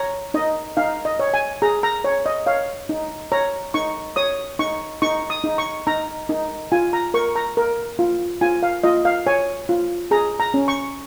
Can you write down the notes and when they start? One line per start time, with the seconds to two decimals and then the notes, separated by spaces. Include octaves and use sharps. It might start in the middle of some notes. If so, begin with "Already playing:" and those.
Already playing: C#5 A#5
0.34 D#4 D#5
0.77 D#4 F5
1.05 D#5
1.19 C#5
1.34 G#5
1.62 G#4 A#5
1.83 A#5
2.04 C#5
2.26 D#5
2.46 C#5 F5
2.89 D#4
3.32 C#5 A#5
3.74 D#4 C#6
4.16 C#5 D#6
4.59 D#4 C#6
5.02 D#4 C#6
5.30 D#6
5.44 D#4
5.58 C#6
5.87 D#4 A#5
6.29 D#4
6.72 F4 G#5
6.93 A#5
7.14 A#4 C#6
7.36 A#5
7.57 A#4
7.99 F4
8.41 F4 G#5
8.63 F5
8.84 F4 D#5
9.05 F5
9.27 C#5 G#5
9.69 F4
10.11 G#4 A#5
10.40 A#5
10.54 C#4
10.68 C#6